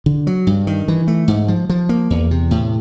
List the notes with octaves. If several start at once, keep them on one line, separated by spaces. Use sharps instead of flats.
D3
F#3
G2
D#3
E3
A3
G#2
F3
F3
A#3
E2
C3
A2